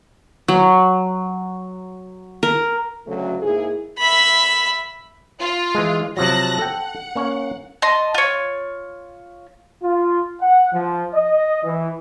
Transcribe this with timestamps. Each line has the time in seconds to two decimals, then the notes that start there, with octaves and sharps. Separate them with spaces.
0.48 F#3
2.43 A#4
3.07 D2 C#3 F#3 A3
3.42 G#2 A#3 E4 G#4
3.98 E5 B5
5.39 F4
5.75 E3 G#3
6.17 C3 F3 F#3 A5 F#6 A#6
6.59 A4 F#5 G5
7.15 A#3 C#4 C#5
7.82 D#5 A5 C6
8.14 F4 C#5
9.83 F4
10.41 F#5
10.73 F3
11.15 D#5
11.64 E3